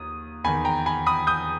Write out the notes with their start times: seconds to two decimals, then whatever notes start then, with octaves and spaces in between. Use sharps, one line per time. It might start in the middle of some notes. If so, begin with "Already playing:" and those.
Already playing: D#2 D#6
0.44 E2 D#3 G#5 B5
0.65 G5 A#5
0.86 G#5 B5
1.06 B5 D#6
1.27 D#6 G6